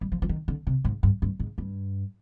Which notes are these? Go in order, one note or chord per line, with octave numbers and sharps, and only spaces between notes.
G3
F3
F3
D#3
D3
C3
G#2
G2
G2
G#2
G2